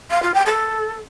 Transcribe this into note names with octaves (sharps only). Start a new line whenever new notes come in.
F5
F4
G5
A4